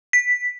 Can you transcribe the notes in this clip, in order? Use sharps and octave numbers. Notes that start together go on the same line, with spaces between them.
B6